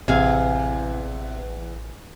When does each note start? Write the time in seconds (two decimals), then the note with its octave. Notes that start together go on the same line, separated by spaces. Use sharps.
0.08 A1 E2 C3 G#4 F5 G#5